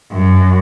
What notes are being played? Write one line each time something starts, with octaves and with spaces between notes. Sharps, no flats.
F#2